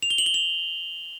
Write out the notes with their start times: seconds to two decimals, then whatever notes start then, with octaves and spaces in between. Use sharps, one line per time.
0.03 F7
0.10 G7
0.18 F#7
0.26 G7
0.34 F7